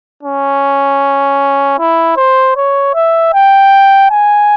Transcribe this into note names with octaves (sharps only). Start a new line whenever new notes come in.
C#4
E4
C5
C#5
E5
G5
G#5